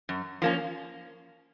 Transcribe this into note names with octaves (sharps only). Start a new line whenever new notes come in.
F#2
F3 A#3 C#4